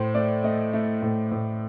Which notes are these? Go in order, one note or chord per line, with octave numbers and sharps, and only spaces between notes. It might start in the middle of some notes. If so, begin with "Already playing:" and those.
Already playing: A2 C5
A3 D5
A3 D#5
A3
A2
A2